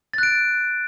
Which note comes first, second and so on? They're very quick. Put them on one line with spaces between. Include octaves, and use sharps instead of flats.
A6 F#6 D7